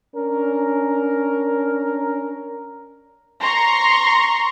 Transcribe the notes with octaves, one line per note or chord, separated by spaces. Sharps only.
C#4 D4 A#4
A#5 C6 C#6